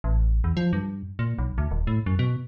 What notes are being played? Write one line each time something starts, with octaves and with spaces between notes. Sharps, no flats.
A1
E2
F3
G2
A#2
B1
D2
D#1
A2
F#2
B2